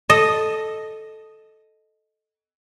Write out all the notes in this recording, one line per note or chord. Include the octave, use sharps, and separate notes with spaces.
A4 D#5